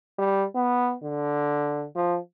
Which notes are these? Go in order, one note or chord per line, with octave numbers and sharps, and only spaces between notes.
G3
B3
D3
F3